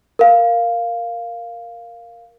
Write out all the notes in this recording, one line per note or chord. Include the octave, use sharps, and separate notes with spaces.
A#4 F5